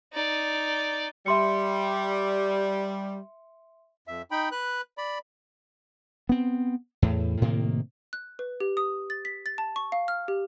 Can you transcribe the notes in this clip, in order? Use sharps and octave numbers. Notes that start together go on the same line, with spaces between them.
D#4 D5
G3 E5 C6 C#7
F2 E5
D#4 G5 B5
B4 F#6
D5 B5
B3 C4
E2 A2
A2 C3 D#3 A#3
F#6
B4
G4
D#6
A6
B6
A6
A5
C#6
F5
F6
G4